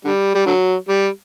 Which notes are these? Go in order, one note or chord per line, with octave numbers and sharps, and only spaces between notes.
D3 G3
G3
D3 F#3
G3